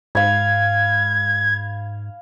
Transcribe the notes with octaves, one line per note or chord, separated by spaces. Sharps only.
G#2 F5 B5 G#6